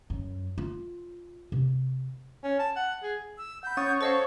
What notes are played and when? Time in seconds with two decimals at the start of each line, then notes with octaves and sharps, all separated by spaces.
0.10 F#2
0.58 F4
1.52 C3
2.44 C#4
2.60 A5
2.76 F#5
3.03 G#4
3.38 E6
3.63 F#5 B5 G6
3.77 C#4 C#5 F#5 D#6 A6
4.01 A4 C5 D#5 F5